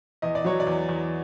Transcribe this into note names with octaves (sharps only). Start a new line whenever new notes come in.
E2 D#5
D5
F#3 C#5
D5
E2
E2